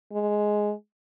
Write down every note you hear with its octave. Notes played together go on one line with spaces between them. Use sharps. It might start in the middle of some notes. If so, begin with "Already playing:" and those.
G#3